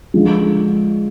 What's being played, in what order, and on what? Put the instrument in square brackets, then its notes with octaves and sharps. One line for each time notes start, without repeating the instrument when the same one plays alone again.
[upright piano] D3 F3 G#3